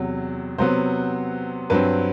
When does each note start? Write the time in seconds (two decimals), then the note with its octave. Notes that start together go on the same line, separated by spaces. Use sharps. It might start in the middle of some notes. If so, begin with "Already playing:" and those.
Already playing: E2 C3 F#3
0.58 C3 F#3 B3 C5
1.70 G2 F#3 C4 B4